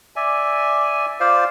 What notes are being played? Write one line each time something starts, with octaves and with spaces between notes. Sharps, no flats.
D5 E5 G#5
F4 C5 D5 F5